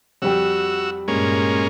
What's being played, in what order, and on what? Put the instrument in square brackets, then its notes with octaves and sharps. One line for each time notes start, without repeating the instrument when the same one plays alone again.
[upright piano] F2 G3 G5 [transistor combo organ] F#4 E6
[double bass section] G2 A#2 [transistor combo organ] G#3 A#3 C#4